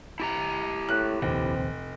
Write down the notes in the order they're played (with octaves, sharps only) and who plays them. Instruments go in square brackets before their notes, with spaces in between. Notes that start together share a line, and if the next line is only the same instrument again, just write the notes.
[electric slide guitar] E4 G4 A#5
[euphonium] A2 [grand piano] F#6
[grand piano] F1 [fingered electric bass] A#1 D#2 [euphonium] C4